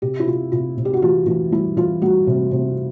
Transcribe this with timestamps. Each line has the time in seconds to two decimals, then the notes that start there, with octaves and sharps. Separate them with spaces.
0.02 C3 G4
0.20 E4
0.27 C3 F4
0.52 C3 F4
0.77 C3
0.85 G4
0.93 F#4
1.02 E3 F4
1.26 E3 F4
1.52 G3 E4
1.77 E3 F4
2.02 G3 F#4
2.27 C3
2.51 C3